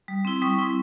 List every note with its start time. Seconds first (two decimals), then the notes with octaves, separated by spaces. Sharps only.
0.08 G3
0.25 C4 E4
0.41 G3 C#6 D#6
0.58 C4 E4